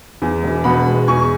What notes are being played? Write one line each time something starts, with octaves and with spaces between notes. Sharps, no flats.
E2
E1
B2 F#5 B5
G#3
E2 G#5 C#6